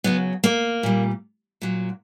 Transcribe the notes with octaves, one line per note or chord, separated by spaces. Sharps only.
C#3 F#3 B3
A#3
A#2 G3
A#2 F#3